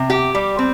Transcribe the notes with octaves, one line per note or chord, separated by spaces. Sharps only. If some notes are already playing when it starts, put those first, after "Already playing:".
Already playing: C3
G4
G3
C4